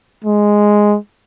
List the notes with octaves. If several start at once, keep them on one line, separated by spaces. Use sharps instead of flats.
G#3